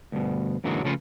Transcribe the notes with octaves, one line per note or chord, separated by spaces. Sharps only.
D2 G2 B2
F#2 A#2 D3 E3 F#3 G#3
C#3 F3 A3 C#4 F4 B4